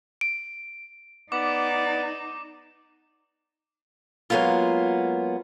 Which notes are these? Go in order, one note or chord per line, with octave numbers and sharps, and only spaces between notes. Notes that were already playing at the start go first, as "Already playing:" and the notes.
D7
B3 D#4 D5 D6
F#3 G#3 A#3 B3 F4